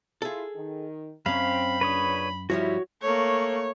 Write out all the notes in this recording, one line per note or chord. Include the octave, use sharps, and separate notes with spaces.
E4 F4 G#4 A4
D#3
F#2 C4 C#4 F5 B5
A#2 C#3 D4 B4 C#5 D#6
G2 F3 G3 E4 F#4 C#5
A3 A#3 C#5